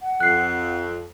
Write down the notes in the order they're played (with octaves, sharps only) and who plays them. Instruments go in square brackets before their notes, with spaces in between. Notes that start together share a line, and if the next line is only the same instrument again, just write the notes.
[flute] F#5
[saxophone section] F2 [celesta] F#6 C7